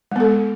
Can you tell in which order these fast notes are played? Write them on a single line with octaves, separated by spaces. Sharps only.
G#3 B3 A4